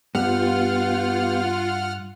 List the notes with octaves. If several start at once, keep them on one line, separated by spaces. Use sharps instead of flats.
G2 B3 F4 G4 F#5 F6